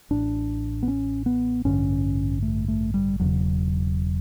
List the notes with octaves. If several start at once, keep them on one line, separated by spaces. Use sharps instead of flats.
A1 A2 D4
B3
C#4
B3
A1 G2 D3 C#4
A3
A3
G3
E1 E2 C#3 F#3